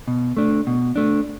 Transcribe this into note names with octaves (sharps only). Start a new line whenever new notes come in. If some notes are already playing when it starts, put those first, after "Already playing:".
B2
A3 D4
B2
A3 D4